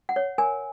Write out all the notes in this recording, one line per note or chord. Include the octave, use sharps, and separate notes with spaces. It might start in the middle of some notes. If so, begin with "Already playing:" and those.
F#5
C#5
A#4 G#5